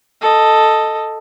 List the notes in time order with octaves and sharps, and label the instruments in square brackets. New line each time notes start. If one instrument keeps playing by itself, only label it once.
[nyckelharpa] A4 D#5